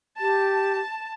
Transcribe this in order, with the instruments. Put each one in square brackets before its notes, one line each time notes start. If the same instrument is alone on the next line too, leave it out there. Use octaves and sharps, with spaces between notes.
[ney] G4 [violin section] A5